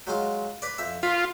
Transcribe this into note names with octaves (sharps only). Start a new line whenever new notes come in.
F#3 G#3 F4
B4 D5
F2 E5
F4 B5